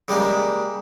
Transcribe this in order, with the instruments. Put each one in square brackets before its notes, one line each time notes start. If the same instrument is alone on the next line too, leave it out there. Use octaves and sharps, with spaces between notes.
[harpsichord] C#3 G3 G#3 A#3